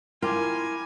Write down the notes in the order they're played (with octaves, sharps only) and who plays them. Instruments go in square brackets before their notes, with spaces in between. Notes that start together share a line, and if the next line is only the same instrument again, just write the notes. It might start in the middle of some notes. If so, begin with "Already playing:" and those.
[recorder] E4 [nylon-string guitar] F4 [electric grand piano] A#4 G5 D6 [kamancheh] G#5